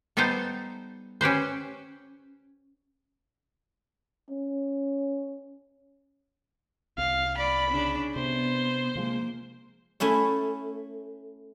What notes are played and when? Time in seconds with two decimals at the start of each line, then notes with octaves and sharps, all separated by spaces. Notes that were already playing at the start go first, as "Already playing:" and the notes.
0.17 G3 B3 D#4 A4 C5
1.21 C#4 G4 B4 C5
4.30 C#4
6.98 C2 F5
7.37 D5 B5
7.71 C#3 D4
8.16 C3 B3 C5
8.95 C3 F3 G#3 A#3
10.00 A3 C#4 E4 C#5